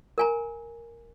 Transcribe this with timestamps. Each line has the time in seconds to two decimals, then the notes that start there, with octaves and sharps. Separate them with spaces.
0.18 A#4 G#5 A#5